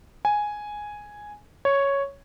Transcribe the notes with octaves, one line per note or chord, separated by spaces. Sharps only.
G#5
C#5